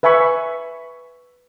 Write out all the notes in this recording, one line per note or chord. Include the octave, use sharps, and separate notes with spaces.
B4 E5 G#5 B5 C#6